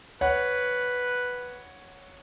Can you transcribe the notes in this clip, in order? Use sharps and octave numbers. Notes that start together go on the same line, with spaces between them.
B4 C#5 F#5